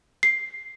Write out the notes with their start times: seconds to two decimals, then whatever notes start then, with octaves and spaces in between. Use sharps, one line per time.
0.23 C7